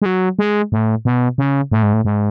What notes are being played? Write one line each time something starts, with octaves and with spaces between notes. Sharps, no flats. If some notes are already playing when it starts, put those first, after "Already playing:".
G#3
F#3
G#3
A2
B2
C#3
A2
G#2
A2
G#2